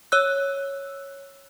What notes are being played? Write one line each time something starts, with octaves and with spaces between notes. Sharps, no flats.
C#5 E6 F#6